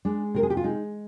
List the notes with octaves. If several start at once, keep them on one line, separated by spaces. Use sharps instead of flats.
G#3 D4
C3 A#4
G#4
G4
F4
G#3 D#4